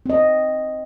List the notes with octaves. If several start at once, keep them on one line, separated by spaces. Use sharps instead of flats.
C4 D#5